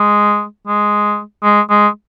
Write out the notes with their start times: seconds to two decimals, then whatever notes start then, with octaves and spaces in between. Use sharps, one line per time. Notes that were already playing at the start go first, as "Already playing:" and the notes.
Already playing: G#3
0.67 G#3
1.43 G#3
1.70 G#3